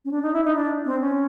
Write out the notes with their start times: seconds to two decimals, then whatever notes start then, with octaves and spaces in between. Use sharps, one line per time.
0.05 C#4
0.11 D4
0.23 D#4
0.33 E4
0.45 D#4
0.55 D4
0.85 C4
1.01 C#4